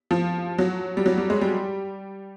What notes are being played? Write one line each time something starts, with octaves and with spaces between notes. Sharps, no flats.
F3
F#3
G3
F#3
G3
G#3
G3